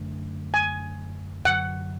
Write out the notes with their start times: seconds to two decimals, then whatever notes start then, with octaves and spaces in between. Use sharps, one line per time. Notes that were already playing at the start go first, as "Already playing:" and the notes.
Already playing: F#2 D3 A3 D4
0.54 G#5
1.45 F#2 D3 F#3 F#5